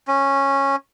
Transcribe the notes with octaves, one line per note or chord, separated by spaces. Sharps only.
C#4